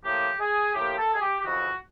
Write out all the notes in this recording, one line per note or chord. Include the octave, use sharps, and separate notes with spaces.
A2 F3 A#3 G4
G#4
A2 F3 A#3 G4
A4
G#4
G4
G4
F2 C#3 E3 F#4